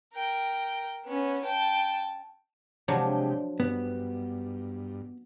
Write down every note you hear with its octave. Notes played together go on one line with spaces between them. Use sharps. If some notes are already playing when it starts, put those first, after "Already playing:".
A#4 G5
B3 C#4
G5 A5
C3 F3 F#3 G#3 D4 G4
G2 B3